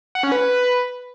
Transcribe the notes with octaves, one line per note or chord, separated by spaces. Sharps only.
F#5
C#4
B4